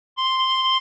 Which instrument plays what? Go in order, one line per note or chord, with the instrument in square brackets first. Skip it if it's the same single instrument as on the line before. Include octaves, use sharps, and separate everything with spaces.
[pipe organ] C6